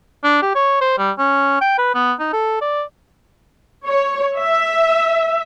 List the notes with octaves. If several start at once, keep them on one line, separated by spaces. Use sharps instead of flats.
D4
G4
C#5
C5
G3
C#4
G5
B4
B3
D#4
A4
D5
C#5
E5